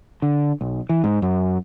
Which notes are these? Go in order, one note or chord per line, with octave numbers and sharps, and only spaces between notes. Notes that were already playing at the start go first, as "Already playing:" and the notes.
D3
B1
E3
G#2
F#2